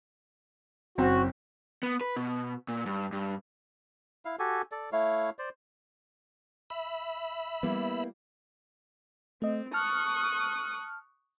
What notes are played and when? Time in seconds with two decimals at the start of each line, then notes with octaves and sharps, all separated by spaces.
0.98 F#1 C4 F#4
1.83 B3
2.01 B4
2.16 B2
2.68 A#2
2.86 G2
3.13 G2
4.25 E4 F5
4.39 F#4 G4 A4 G#5
4.72 A4 D5
4.92 A3 E4 C#5 F5
5.39 C5 D5
6.70 E5 B5
7.63 G3 A#3 B3 E4
9.42 A3 C4 D#5
9.73 A5 C#6 D#6 F6 F#6